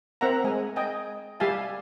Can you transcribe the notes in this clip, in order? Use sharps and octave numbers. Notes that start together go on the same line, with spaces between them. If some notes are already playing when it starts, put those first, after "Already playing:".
C4 A#4 E5 F#5 A#5
G#3 G#5
D#5 G5 G#5
G3 G4 E5 F5 G#5 A5